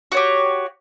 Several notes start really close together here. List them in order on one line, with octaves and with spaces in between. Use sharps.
F#4 C#5 G4